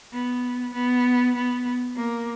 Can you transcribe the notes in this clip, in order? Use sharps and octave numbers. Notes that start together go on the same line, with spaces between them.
B3
B3
B3
A#3